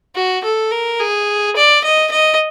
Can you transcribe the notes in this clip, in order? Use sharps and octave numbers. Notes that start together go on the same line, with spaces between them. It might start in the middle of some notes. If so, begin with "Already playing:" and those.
F#4
A4
A#4
G#4
D5
D#5
D#5